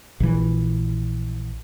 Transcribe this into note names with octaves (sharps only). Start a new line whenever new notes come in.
A#1 E3